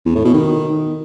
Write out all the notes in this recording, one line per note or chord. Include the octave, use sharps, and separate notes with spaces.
E2
A2
B2
D#3